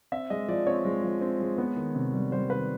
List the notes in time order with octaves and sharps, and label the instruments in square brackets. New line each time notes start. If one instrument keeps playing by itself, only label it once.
[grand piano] C4 E5
G#3 D#5
F3 D5
C4 C#5
G#3
F3
C4
G#3
B3
D#3
C3
G3
G3 C5
D#3 B4